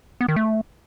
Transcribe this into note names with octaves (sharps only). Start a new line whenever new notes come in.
B3
D#3
A3